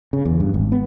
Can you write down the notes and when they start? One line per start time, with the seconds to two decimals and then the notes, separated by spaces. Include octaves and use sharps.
0.13 C#3
0.25 E2
0.40 G2
0.54 G#1
0.72 B3